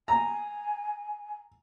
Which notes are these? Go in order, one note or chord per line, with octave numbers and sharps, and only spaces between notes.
G#5 A#5